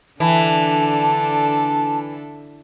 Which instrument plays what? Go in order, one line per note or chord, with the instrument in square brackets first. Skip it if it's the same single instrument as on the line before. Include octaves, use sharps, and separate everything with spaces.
[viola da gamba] D3 D4 A4 [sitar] E3 [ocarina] A5